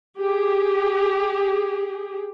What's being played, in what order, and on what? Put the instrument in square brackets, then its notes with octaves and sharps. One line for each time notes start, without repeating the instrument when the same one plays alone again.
[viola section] G4 G#4